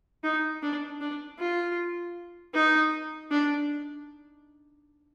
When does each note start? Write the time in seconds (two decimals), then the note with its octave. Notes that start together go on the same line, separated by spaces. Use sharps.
0.24 D#4
0.62 D4
1.01 D4
1.39 F4
2.54 D#4
3.31 D4